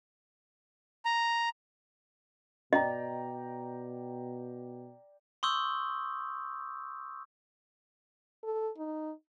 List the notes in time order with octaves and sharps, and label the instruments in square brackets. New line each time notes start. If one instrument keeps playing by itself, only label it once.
[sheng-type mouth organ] A#5
[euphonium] B2 [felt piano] D5 G5 A#5 [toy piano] D#5
[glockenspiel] C6 C#6 D#6 E6 G6
[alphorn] A4
D#4